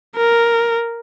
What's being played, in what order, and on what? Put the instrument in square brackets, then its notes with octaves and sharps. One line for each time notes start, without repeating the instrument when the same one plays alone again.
[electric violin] A#4